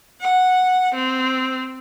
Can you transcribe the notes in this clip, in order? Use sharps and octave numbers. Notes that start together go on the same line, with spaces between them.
F#5
C4